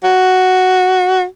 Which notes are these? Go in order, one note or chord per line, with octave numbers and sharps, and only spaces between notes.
F#4